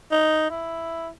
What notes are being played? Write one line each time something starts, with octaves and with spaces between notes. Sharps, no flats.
D#4
E4